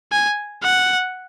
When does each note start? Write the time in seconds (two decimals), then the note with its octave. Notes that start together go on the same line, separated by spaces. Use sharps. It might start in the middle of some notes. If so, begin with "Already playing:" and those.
0.12 G#5
0.64 F#5